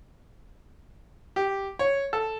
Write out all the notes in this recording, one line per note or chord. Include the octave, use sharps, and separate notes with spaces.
G4
C#5
A4